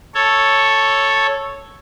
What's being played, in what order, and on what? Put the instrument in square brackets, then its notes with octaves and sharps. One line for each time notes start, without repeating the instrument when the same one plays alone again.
[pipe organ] A4 C#5